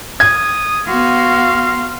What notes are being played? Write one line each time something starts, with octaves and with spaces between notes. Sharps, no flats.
D#6 G#6
B3 F#4 F5 C6